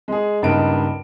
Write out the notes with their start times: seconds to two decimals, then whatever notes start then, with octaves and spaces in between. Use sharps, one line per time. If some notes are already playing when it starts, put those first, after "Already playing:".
0.08 G#3 G#4
0.42 C#2 G2 A#3 D#4 D7